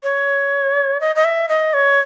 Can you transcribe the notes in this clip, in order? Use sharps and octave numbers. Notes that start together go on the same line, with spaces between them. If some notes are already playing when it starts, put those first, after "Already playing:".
C#5
D#5
D#5
E5
D#5
C#5